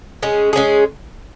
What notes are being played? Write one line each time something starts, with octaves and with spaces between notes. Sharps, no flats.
G#3 C#4 G#4
G#3 C#4 G#4